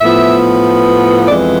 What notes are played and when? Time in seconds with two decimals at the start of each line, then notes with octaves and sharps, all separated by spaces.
0.01 A2 F3 B3 E5
1.28 F2 E3 G#3 B3 D5